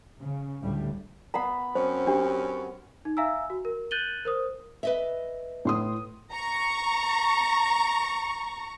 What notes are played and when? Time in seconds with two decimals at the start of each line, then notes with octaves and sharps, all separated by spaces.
0.19 C#3
0.62 D2 A2 G3
1.34 B3 F#5 A#5 B5
1.75 F#2 C4 C#4 C5
2.07 D4 G4
3.05 D#4
3.17 E5 F5 G#5 A#5 E6
3.50 F#4
3.65 A#4
3.91 F#6 G6 A6 D#7 F#7 G7
4.25 A#4 C5 D#6
4.83 B4 D#5 E5
5.65 A2 C6 D#6
6.33 A#5 C#6